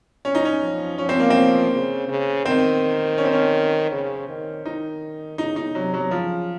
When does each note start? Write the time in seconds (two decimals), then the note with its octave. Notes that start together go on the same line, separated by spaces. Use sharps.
0.25 C#4
0.35 D#4
0.45 C#4
0.62 F3
0.98 F3 C#4
1.09 C4
1.20 A#3
1.30 C4
1.72 C#3
2.08 C#3
2.45 D#3 C4
3.18 C#4
3.25 C4
3.32 C#4
3.91 C#3
4.28 D#3
4.65 D#3 D#4
5.38 C#3 D#4
5.56 D#4
5.75 C3 F#3
5.94 F#3
6.11 C#3 F3